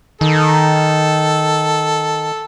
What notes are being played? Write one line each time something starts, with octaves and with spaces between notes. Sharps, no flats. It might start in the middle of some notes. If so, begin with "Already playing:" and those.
D#3 A4